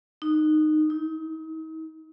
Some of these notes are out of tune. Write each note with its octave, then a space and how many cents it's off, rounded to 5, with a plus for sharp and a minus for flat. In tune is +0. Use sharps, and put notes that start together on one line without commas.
D#4 -15
D#4 +40